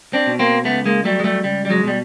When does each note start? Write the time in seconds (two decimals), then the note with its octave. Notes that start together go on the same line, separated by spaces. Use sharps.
0.13 C4 D4
0.27 B2
0.39 A#3 C4
0.65 C#2 A3 B3
0.86 G#3 A#3
1.05 F#3 G3 A3
1.20 G#3
1.24 G3 A3
1.44 C#2 G3
1.65 G3
1.70 F#3 G#3
1.83 B2 G3